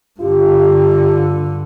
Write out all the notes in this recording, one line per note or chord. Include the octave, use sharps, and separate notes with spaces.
G2 D3 F4 G4